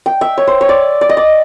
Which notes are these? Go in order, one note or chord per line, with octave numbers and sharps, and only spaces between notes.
G5
E5
C#5
C5
C#5
D5
D5
D#5
D5